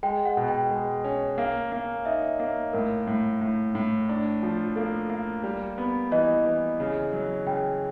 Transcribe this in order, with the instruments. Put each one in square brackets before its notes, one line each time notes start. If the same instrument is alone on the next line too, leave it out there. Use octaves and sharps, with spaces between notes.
[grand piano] G#3 [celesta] G5
[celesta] F#5
[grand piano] B2
[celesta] G5
[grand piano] G#3
C#4
[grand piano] A#3 [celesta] F5
[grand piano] A#3
[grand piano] D#4 [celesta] E5
[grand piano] A#3
[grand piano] A2 [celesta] A#4
[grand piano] A2
A2
A2
D4
F3
[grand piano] A#3 [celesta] A4
[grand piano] A#3
G3
B3
[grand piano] E3 [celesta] D#5
[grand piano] E3
C#3
F#3
[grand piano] C#3 [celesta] G5